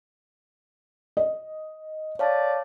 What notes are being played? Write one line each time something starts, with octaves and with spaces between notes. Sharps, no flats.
D#5
C#5 D5 F5 A5